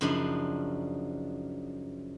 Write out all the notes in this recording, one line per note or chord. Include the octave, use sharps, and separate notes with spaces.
F#2 C#3 F3 D4 D#4 B5